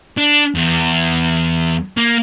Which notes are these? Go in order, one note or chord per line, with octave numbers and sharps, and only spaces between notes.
D4
E2
A#3